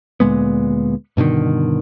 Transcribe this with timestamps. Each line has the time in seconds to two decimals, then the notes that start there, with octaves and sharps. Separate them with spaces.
0.20 D2 A#2 G#3 B3
1.17 G2 B2 D3 D#3